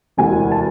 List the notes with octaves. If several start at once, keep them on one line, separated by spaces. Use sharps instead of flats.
E1 D2 C3 E3 G#5
A5